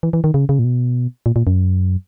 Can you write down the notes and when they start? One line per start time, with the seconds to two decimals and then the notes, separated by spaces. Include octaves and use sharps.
0.03 E3
0.13 E3
0.24 D#3
0.34 C#3
0.49 C#3
0.59 A#2
0.64 B2
1.26 A#2
1.36 A#2
1.47 F#2